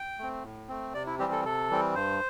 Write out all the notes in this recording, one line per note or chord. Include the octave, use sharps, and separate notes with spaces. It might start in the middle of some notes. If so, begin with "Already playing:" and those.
Already playing: G5
A3 C4
A2
A3 C4
C3 D5
E4
E3 G3 C4 G4
A4
C3 A4
E3 G3 C4
G2 C5